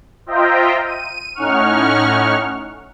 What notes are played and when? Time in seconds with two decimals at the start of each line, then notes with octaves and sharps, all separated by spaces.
0.26 F4 C5 D#5 E5 G5 A#5
0.86 D#7
1.35 A2 C#4 D#4 F#5 C#6 F6